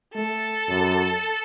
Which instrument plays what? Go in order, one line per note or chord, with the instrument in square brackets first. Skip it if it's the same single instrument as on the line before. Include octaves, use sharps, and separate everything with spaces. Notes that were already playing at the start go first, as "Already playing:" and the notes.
[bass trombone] A3 [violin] A4
[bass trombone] F#2